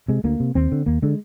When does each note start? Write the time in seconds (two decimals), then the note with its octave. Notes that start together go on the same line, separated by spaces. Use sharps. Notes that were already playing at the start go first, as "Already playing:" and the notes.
0.08 C3 G#3
0.24 D2 A#3
0.40 C3
0.55 D#2 C4
0.72 D3
0.86 D#2 A#3
1.02 D3 G#3